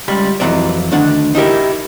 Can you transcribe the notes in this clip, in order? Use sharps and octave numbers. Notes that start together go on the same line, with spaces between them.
C#2 G3 B5
F2 A2 E3 F#3 D5
D2 D#3 D4 F#5
D#4 E4 G4 A#4